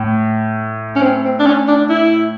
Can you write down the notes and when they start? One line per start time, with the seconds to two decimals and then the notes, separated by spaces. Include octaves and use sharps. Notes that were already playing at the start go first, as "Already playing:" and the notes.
Already playing: A2
0.96 C#4
1.02 C4
1.24 C4
1.40 D4
1.46 C#4
1.68 D4
1.89 E4